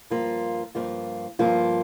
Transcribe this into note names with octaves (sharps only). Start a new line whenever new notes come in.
G2 F3 A#3 F4
G2 F3 A#3 F4
G2 F3 A#3 F4